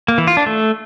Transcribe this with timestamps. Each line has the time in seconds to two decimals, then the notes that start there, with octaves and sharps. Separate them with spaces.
0.08 A#3
0.18 E3
0.27 F4
0.37 D4
0.46 A3